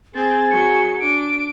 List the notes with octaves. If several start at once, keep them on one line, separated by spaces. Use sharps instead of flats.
C4 G#4 A6
F#3 C#7
D4 D7